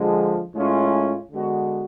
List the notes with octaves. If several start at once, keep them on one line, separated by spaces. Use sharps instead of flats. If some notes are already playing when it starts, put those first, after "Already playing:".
Already playing: D3 F3 G#3
A2 G#3 C#4 F4
D3 G#3 B3 F#4